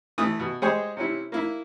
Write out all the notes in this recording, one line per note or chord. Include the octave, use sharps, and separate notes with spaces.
E3 A3 D#6
B2
G#3 G4 G#4 C5 C#5 G#5
C3 C#4 E4
A#3 E4